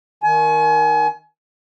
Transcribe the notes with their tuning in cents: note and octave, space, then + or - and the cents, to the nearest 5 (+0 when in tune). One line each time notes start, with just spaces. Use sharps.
D#3 +5 G#5 +35